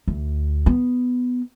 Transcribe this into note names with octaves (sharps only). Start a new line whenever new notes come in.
D2
B3